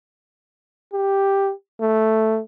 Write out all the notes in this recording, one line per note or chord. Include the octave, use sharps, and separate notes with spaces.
G4
A3